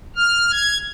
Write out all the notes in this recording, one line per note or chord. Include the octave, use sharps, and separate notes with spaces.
F6
G#6